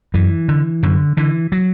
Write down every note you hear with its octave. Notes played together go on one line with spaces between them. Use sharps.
F#2 E3
D3
F#2 D3
D3 E3
F#3